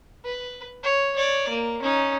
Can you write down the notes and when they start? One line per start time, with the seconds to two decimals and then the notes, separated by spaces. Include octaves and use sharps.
0.25 B4
0.83 C#5
1.16 C#5 D5
1.48 A#3
1.82 C#4 D#4